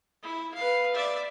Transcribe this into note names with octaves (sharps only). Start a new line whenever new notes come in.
E4
B4 F5
D5 E5